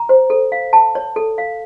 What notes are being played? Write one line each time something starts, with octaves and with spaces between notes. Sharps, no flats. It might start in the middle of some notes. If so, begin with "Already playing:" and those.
Already playing: A#5
C5
A4
F5
A5
C#5
A4
F5